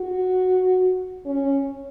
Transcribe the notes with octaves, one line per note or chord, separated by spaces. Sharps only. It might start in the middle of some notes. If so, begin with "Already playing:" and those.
Already playing: F#4
C#4